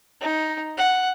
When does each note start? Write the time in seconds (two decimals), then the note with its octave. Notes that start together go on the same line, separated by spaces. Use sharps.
0.21 D#4
0.77 F#5